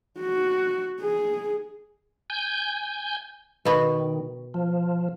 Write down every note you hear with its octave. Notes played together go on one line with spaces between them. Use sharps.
F#4
G#4
G#5 G6
B2 D#3 B3 F#4
F3